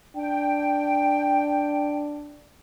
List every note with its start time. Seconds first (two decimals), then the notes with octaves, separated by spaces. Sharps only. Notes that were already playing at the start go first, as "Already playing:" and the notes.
0.16 D4 G5